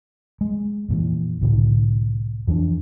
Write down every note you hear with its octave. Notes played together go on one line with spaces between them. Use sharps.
G#3
F2 A#2 E3
C2 A2 D3
F2 E3 F3 D4